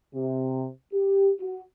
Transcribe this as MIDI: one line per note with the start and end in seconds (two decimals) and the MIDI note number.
0.14 0.66 48
0.94 1.31 67
1.41 1.62 66